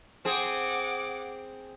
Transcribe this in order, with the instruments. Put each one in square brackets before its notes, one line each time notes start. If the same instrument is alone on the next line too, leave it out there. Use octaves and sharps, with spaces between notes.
[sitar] C4 G#4 [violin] F#5 D6